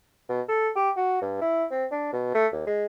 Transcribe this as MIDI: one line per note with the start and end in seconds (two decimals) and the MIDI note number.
0.29 0.41 47
0.49 0.70 69
0.76 0.90 67
0.97 1.21 66
1.22 1.40 43
1.42 1.65 64
1.71 1.86 60
1.91 2.11 62
2.13 2.32 47
2.35 2.47 57
2.52 2.66 39
2.67 2.86 56